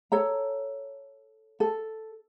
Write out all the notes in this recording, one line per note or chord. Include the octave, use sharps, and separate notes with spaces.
A4 C#5 A#5
A4